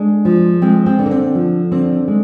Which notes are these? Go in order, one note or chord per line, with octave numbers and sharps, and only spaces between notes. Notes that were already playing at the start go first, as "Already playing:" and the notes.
Already playing: G#3 D4
F3
G#3 C4
C4
D3
A#3
C4
F3
D3 C4
G#3